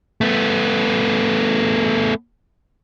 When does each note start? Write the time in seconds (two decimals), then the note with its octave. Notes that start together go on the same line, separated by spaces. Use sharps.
0.21 A3 B3